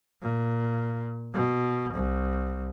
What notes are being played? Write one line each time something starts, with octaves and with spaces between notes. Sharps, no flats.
A#2
B2
C2